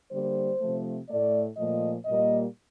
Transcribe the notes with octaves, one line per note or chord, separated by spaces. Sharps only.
D3 G3 A#3 C5
C3 F3 A3
A2 A3 D5
A#2 F3 A3 D#5
A#2 G3 A#3 D#5